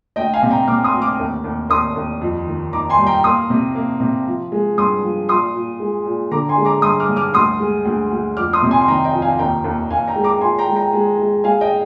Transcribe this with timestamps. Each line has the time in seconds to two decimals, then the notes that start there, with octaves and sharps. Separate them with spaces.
0.16 D2 D#5 G5
0.34 F5 G#5
0.43 C3
0.51 G5 A#5
0.68 C3 D6 F6
0.84 C6 D#6
0.93 D2
1.02 D6 F6
1.19 D#2
1.44 D#2
1.70 D#2 C6 D#6
1.96 D#2
2.21 F2
2.47 D#3
2.73 D#3 A#5 D6
2.90 G#5 C6
2.98 G3
3.07 G5 A#5
3.24 A#3 C6 D#6
3.50 C3
3.75 A#3
4.00 C3
4.27 F3
4.52 G#3
4.78 G2 C6 D#6
5.03 F3
5.29 A#2 C6 D#6
5.54 A#2
5.80 G#3
6.05 A#2
6.31 D3 A#5 D6
6.49 G#5 C6
6.57 G#3
6.65 A#5 D6
6.82 G2 C6 D#6
7.00 D6 F6
7.09 G2
7.16 D6 F6
7.34 D2 C6 D#6
7.60 G#3
7.85 D2
8.11 D2
8.37 F2 D6 F6
8.53 C6 D#6
8.63 C3
8.71 G#5 C6
8.81 C6
8.88 D#3 G5 A#5
9.05 D#5 G5
9.13 F2
9.22 F5 G#5
9.39 D#2 G5 A#5
9.64 D#2
9.90 D#2 F5 G#5
10.08 G5 A#5
10.16 G#3
10.24 A#5 D6
10.41 A#2 G#5 C6
10.58 G5 A#5
10.68 G#3
10.75 G5 A#5
10.93 G#3
11.18 G#3
11.44 G#3 F5 G#5
11.61 D#5 G5